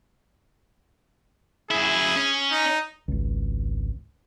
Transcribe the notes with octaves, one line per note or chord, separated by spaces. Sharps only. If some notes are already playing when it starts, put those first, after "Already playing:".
F#2 E4 G#4
C#4
D#4
G#1 C#2